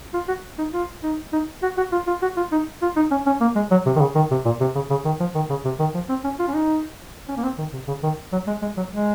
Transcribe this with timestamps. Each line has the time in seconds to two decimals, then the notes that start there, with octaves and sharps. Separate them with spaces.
0.14 F4
0.28 F#4
0.58 D#4
0.74 F4
1.03 D#4
1.33 D#4
1.63 F#4
1.78 F#4
1.92 F4
2.07 F4
2.22 F#4
2.37 F4
2.52 D#4
2.82 F4
2.96 D#4
3.11 C#4
3.26 C#4
3.41 A#3
3.56 G#3
3.71 F#3
3.86 C3
3.96 D#3
4.00 C#3
4.15 D#3
4.31 C3
4.45 A#2
4.61 C3
4.75 C#3
4.90 C#3
5.05 D#3
5.20 F3
5.35 D#3
5.50 C#3
5.65 C3
5.79 D#3
5.95 F3
6.09 C4
6.24 C#4
6.39 F4
6.48 C#4
6.54 D#4
7.29 C#4
7.37 A#3
7.44 C4
7.58 D#3
7.73 C3
7.88 C#3
8.03 D#3
8.32 F#3
8.47 G#3
8.62 G#3
8.77 F#3
8.92 G#3